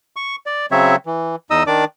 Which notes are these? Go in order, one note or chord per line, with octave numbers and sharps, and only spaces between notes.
C#6
D5
C#3 F#3 C4 C#5 E5
E3
E2 D#4 D#5 D#6 E6
D#3 D4 D5 D6